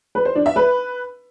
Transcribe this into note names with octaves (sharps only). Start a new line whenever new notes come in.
B4
C5
D4
E5
B4